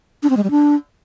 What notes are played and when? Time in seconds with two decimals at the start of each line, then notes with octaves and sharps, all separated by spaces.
0.23 D4
0.30 C4
0.37 G#3
0.44 G3
0.51 D4